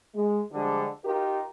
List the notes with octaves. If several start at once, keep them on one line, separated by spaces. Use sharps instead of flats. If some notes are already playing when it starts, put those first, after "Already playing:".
G#3
D3 F3 G3 G#3 D4
D#4 F4 G4 A#4